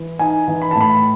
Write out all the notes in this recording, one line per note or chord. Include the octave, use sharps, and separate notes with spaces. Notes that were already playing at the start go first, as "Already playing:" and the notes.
Already playing: E3
D#4 G#5
E3
B5
A2 A5
B5